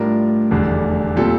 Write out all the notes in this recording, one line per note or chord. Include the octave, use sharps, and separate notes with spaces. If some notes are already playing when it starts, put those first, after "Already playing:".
Already playing: A2 G3 D4 F4 A#4
F1 E2 D3 G3 D4
A#2 G3 C4 F4 A4